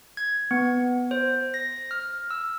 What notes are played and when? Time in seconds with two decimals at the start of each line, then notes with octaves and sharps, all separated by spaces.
0.17 G#6
0.51 B3
1.11 C5
1.54 A#6
1.91 F6
2.31 E6